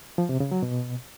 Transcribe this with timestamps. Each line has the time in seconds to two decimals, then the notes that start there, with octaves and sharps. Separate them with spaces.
0.18 F3
0.29 C3
0.40 C#3
0.51 F#3
0.63 B2